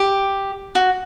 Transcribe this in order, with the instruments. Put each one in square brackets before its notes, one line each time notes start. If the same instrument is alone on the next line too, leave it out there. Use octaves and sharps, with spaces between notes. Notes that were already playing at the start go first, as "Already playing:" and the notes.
Already playing: [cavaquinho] G4
F#4